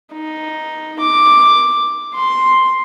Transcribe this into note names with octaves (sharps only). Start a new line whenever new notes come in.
D#4
D6
C6